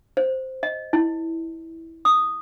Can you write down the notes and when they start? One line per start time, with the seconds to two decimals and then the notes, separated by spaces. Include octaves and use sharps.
0.17 C5
0.63 D#5
0.93 E4
2.05 D#6